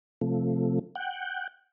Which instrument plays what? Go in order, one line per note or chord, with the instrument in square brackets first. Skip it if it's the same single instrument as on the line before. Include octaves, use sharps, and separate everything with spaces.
[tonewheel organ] C3 F3 A3
F#5 G5